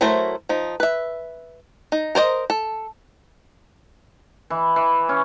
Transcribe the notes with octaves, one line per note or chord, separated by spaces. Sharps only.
F#3 A3 E4 A#4 C5
F3 D#4
B4 E5
D#4
A#4 C5 D5 D#5
A4
E3
E3
C#4